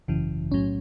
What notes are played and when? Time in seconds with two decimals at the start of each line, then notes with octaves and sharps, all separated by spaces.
0.08 G#1 F#2 C#3 E3
0.52 B1 A2 F#3 C#4